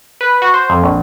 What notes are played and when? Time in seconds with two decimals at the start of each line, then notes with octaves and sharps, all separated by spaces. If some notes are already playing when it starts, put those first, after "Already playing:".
0.21 B4
0.42 F#4
0.54 C5
0.70 F2
0.83 A#1